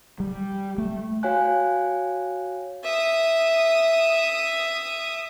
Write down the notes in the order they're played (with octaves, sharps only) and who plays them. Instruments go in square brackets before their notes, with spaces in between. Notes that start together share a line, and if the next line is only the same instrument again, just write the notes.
[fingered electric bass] G3
A3
[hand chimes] F#4 C#5 F5 G5 G#5 F#6
[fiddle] E5 D#6